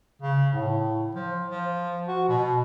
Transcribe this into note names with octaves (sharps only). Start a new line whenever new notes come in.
C#3
A2
F3
F3
F#4
B2